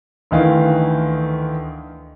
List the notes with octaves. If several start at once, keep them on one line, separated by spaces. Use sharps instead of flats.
D2 D#3 E3 F5